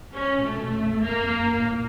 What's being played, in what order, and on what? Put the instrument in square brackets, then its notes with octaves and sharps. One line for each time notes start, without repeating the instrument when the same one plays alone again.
[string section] C#4
[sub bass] A#2
[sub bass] B2 [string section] A3
[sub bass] B2
F2
E2
[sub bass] F2 [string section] A#3
[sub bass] F2
F#2
G2
A2
A#2